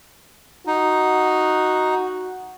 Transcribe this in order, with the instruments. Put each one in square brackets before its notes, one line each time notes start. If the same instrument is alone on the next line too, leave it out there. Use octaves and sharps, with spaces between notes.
[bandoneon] D#4 [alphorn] F#4